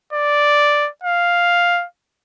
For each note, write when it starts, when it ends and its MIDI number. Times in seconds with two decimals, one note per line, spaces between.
0.13 0.89 74
1.04 1.85 77